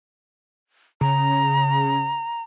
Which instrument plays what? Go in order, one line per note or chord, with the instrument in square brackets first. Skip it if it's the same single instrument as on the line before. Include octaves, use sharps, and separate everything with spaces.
[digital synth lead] C#3 [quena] A#5